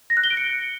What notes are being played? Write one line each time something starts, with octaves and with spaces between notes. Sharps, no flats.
A#6
F#6
G7
D7
C#7